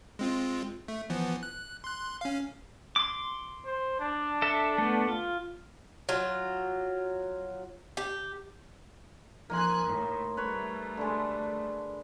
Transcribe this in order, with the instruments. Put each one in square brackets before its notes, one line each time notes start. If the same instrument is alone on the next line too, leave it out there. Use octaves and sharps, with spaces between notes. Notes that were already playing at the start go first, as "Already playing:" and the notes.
[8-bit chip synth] G#3 C4 F4
A3
E3 F3 B3
F#6
C6 F#6
C#4 F5
[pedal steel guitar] C6 D6
[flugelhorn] C5
D4
[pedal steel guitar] A4 E5
A3 B3
F4
[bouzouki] F#3 F4
G4
[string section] F3 G#5 F#6 [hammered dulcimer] A#3 D#4 C6
[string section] A2
[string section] G3 A3 [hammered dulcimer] B4 C#5
[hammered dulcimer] D3 G#3